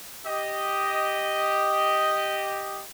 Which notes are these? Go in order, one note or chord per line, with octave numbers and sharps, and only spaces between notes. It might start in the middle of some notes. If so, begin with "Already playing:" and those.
G4 D#5